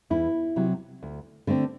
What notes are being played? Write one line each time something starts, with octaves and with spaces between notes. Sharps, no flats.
E2 E4
C3 F#3
D2
D3 A3 C4